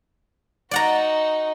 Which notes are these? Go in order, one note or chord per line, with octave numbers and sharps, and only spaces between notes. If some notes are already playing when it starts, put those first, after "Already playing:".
D#4 F#4 D5 F#5 A#5